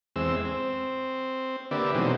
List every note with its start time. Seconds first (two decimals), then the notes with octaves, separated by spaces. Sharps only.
0.16 E2 G#3 C4 E6
0.45 C4
1.71 D3 A#3 G4 B4 D5 E5
1.94 B2 E3 F#3 G#3 C4 D#4